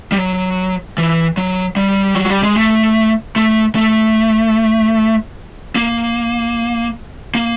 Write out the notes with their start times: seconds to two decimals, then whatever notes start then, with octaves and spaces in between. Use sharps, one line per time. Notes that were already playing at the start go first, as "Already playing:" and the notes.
0.12 G3
0.18 F#3
0.98 E3
1.37 F#3
1.76 G3
2.15 F#3
2.30 G3
2.43 G#3
2.56 A3
3.36 A3
3.75 A3
5.76 A#3
7.35 A#3